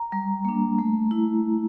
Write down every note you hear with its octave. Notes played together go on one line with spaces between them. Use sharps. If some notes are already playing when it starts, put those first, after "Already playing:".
Already playing: A#5
G3
A#3 D4
A3
E4